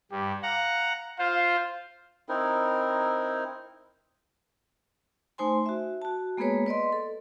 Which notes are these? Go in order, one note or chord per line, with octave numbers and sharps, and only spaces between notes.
G2 G4
F5 F#5 A#5
F4 C5 F5
C4 D#4 E4 A#4
A3 D#4 C5 G#5 C6
F#4 E5
F#4 A5
G#3 A#3 B3 G#4 B4 C#5
B4 D5 D#5 C6
A4